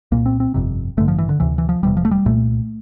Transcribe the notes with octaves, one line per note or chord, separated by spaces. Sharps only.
C2 A#2 A#3
C4
C4
G1 F2 C3
A1 G2 D3 A3
F3
E3
D3
D2 C3 E3
E3
F3
E1 E2 C3 G3
F3
A3
G3
C2 A#2 A3